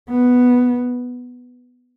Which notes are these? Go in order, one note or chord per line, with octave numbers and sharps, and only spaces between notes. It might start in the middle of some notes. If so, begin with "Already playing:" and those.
B3